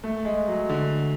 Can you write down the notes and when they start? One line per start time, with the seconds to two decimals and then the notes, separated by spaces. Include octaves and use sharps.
0.04 A3
0.25 G#3
0.48 F#3
0.69 D3